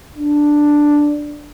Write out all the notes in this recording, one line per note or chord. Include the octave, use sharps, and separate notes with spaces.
D4